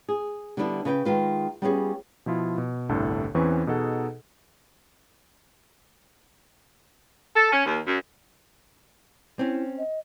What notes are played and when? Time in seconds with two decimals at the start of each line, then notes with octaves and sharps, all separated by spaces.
0.09 G#4
0.57 D3 G3 B3 D4 E4
0.85 C#3 B4 F#5 G5
1.05 D#3 G#3 F4 B4
1.62 G3 B3 C#4 F4 F#4 G#4
2.26 B2 F3 E4 F4
2.58 B2
2.89 G1 C2 A2 D3 A4
3.35 E2 E3 C4 C#4 B4 C#6
3.67 B2 D#4 G#4 A4 F#5
7.35 A4
7.52 C#4
7.66 D#2
7.86 F#2
9.39 C4 C#4 E4
9.78 D#5